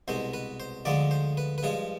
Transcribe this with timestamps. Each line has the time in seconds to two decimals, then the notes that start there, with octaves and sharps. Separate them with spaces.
0.08 C2 B2 G#3 C5
0.34 B4
0.60 C5
0.85 D2 D3 F3 G#3 D5
1.11 C5
1.37 B4
1.58 B4
1.63 G2 F3 G#3 G#4